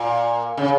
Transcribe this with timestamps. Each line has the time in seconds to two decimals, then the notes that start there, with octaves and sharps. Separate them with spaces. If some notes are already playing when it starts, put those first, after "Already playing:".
Already playing: A#2
0.57 C#3